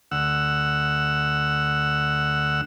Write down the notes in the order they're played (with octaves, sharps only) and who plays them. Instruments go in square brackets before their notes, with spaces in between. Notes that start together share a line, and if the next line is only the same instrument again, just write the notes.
[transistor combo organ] D2 F#5 E6